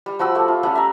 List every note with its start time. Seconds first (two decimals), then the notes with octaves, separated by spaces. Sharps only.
0.06 G3
0.19 F3 F#4 B5 E6
0.35 A3 G4
0.48 F4
0.63 G3 A3 C#4 F#5
0.75 E5 A#5